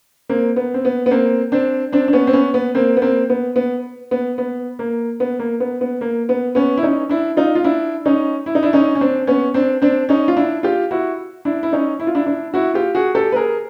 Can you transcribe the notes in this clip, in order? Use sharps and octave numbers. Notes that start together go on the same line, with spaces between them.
A#3 C4
B3
C4
B3
B3
A#3 C4
C4 D4
C4 D4
D4
B3 C#4
C4
B3 C#4
B3
A#3 C4
B3
A#3 C4
B3
B3
B3
B3
A#3
B3
A#3
B3
B3
A#3
B3
B3 C#4
E4
C#4 D#4
D4 E4
D#4 F4
F4
D4 E4
C#4 D#4
E4
D#4
D4 E4
C#4 D#4
C#4
C4 D4
B3 C#4
C4 D4
C4 D4
C#4 D#4
F4
D4 E4
F4 G4
E4 F#4
D4 E4
E4
C#4 D#4
E4
F4
D4 E4
D4 E4
E4 F#4
F4 G4
F#4 G#4
G4 A4
B4
G#4 A#4